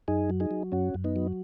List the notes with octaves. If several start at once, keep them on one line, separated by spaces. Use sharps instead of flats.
F#2 D#4 G#4
F#3
D#4 G#4
F#3
F#2 C#4 F#4
F#2
B3 D#4
F#3